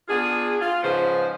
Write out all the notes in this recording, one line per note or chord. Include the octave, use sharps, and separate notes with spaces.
B3 D4 F4 G#4
F4
G#2 C#3 F3 B4 C5